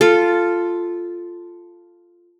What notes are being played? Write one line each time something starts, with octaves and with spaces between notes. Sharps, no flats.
F4 A4